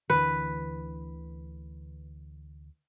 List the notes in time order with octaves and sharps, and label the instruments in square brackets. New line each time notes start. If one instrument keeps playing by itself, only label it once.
[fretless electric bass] D2 D3 E3 [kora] B4